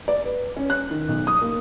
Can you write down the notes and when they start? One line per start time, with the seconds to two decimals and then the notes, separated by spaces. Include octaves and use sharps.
0.08 D5
0.24 B4
0.57 C#4
0.70 F#6
0.91 D#3
1.08 B1
1.27 D#6
1.41 A#3